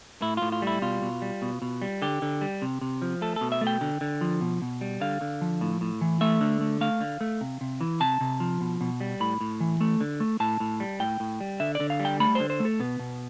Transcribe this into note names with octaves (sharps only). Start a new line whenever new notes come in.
A2 E4
A2 F4
F4
G3 E4
B2 F4
B2
G3
B2
B2
G3
D3 G4
D3
G3
C3
C3
F3
A3 A4
B2 A4
E5
A3
G5
D3
D3
F3
B2
B2
G3
D3 F5
D3
F3
A2
A2
E3
A3 E5
D3
A3
A3 F5
D3
A3
C3
C3
E3
C3 A5
C3
F3
B2
B2
G3
A2 B5
A2
E3
A3
D3
A3
A2 A5
A2
G3
A2 G5
A2
G3
D3 E5
D5
D3
F5
G3
G5
A3 B5
D3 C5
C5
A3
A4
B2 B3
B2